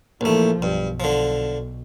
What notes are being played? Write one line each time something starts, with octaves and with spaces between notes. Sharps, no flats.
A#1 E3 F3 A3
B1 G2
D3 F3